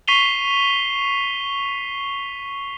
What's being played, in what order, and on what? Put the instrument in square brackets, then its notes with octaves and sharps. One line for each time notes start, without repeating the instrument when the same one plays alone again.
[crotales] C#6 B6 C7 D#7 F7 G7